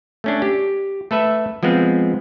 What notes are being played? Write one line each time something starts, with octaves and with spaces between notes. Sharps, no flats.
A3 C#4 D4
G4
A3 A4 B4 E5
F3 G#3 B3 C4